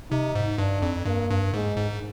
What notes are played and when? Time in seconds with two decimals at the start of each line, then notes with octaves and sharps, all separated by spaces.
0.11 C3 D#4
0.35 G#2
0.58 G2 D4
0.82 F2
1.06 G2 A#3
1.30 G2
1.53 G#2 G#3
1.77 G#2